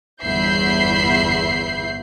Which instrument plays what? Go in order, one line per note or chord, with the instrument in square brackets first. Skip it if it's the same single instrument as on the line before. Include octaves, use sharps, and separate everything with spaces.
[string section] G1 E2 E5 B5 G6 C7